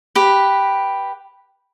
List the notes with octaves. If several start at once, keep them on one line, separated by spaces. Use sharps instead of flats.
G4 B4